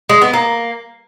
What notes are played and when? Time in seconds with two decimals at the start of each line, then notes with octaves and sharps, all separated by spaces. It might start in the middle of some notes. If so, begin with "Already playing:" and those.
0.09 G#3
0.21 B3
0.33 A#3